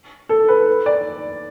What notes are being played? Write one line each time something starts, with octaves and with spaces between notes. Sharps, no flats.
A4
B4
D5